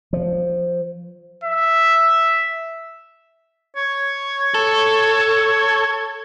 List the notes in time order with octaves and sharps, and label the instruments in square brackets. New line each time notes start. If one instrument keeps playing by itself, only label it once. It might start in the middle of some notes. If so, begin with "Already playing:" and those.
[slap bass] F3
[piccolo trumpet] E5
[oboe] C#5
[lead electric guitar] A4